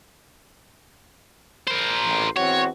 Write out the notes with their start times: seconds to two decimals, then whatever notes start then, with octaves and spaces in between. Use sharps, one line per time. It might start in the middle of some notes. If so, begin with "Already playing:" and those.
1.67 A#4 C5
2.07 A1
2.36 E2 C4 F#4 C#5